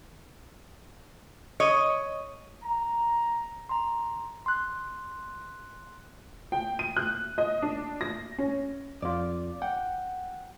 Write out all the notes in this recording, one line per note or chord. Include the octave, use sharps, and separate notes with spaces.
C#5 D#5
A#5
A#5 C6
C6 F#6
G5
D#7
F#6
D#5
D4
A#6
C#4
F2 F4 D5
F#5 G5